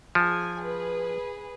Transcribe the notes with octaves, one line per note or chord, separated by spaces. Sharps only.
F3 G#4 G#5
G#4 B4